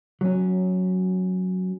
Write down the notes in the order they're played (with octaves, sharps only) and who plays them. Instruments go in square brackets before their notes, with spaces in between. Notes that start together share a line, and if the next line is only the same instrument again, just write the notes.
[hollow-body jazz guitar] F#3 C#4